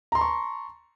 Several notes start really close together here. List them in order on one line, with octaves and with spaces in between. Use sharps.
A#5 C6 A5 C#6